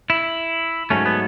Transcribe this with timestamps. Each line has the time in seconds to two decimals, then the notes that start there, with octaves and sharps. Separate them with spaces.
0.10 E4
0.90 G#2 F#3 A3 C#4
1.06 B3